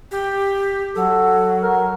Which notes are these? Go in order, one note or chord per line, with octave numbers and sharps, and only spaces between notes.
G4
F#3 A4
A#4